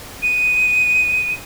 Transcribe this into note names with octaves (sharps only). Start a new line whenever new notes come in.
D#7